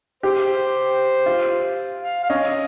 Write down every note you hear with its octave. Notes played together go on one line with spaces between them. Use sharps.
G4 C5
F4
F5
F5
C#4 D#5